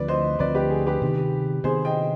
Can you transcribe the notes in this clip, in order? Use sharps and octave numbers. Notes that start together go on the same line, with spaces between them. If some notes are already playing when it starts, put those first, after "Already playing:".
Already playing: D2 D3 F3 C4 B4 D5
C5 D#5
D2 D3 F3 C4 B4 D5
G4 B4
G#4
G4 B4
C3 D#3 B3
C3 D#3 B3 G#4 C5
D#5 G5